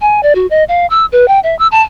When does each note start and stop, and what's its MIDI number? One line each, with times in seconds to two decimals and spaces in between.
0.01 0.21 80
0.23 0.33 74
0.35 0.47 66
0.50 0.64 75
0.69 0.86 77
0.90 1.06 88
1.12 1.28 71
1.28 1.39 79
1.43 1.57 76
1.59 1.67 88
1.72 1.82 81